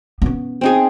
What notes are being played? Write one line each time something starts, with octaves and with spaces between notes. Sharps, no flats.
B3 C#4
C4 D#4 G#4